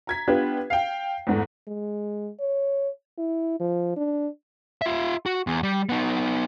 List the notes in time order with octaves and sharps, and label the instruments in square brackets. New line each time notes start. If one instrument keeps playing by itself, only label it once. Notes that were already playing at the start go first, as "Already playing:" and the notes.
[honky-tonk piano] A#5 G#6 B6
B3 D4 F4 G4 B4
F5 G5
E2 G#2 A3
[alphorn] G#3
C#5
E4
F3
D4
[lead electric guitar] F4 E5
F#4
E2
G3
B3 D#4